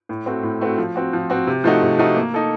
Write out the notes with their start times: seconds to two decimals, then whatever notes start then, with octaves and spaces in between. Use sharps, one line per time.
0.09 A2
0.26 A3 C4 F#4
0.43 A2
0.61 A3 C4 F#4
0.78 F3
0.96 C4 F#4
1.13 F3
1.30 C4 F#4
1.47 C3
1.64 F3 A3 D#4 F#4
1.82 C3
1.99 F3 A3 D#4 F#4
2.16 A#3
2.34 D#4 A4